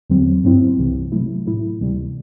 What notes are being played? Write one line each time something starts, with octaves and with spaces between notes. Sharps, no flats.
E2 D3 F#3 C4
G2 F#3 C4 E4
C2 C3 E3
C3 F#3 A3 E4
A2 F#3 A3 E4
D2 C3 E3 G3